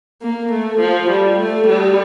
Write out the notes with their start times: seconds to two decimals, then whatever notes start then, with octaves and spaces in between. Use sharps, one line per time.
0.22 A#3
0.52 A3
0.81 F3
1.10 G3
1.39 A3
1.68 G3